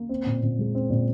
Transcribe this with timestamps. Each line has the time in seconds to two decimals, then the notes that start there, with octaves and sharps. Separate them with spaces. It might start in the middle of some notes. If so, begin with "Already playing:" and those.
Already playing: A#3
0.09 C4
0.26 A#2
0.43 A#2
0.59 G#3
0.75 C4
0.90 A#2